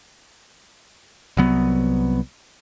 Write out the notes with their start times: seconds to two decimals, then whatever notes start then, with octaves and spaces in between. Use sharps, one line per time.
1.37 C2 F#3 B3